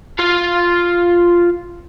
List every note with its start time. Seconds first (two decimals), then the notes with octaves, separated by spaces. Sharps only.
0.19 F4 F5